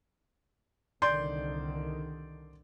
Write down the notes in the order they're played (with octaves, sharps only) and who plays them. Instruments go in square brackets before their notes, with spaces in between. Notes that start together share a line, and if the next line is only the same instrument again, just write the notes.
[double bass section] C2 D3 D#3 [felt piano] D5 C6 G6